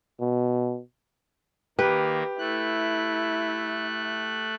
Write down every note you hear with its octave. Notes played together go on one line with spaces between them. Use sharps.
B2
D#3 A#3 G4 B4
A3 E4 F#6